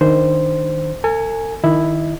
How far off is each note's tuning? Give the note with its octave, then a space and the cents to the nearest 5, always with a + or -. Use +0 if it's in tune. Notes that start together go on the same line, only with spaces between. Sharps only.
D#3 +0 D4 +0 C5 -5
A4 +45 G#5 +0
D#3 +0 E4 +0 D#5 -20